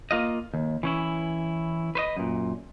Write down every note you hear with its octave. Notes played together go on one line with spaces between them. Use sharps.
A#3 F4 D#5
D#2
E3 C#4 E4
B4 C5 D#5
F#2 A#2